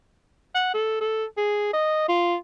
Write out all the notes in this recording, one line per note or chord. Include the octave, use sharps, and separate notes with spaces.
F#5
A4
A4
G#4
D#5
F4